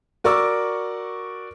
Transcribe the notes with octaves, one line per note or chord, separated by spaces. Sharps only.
F#4 A#4 D5 C#6 D6 E6